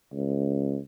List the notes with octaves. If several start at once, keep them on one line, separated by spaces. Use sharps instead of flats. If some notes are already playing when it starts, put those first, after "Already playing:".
C#2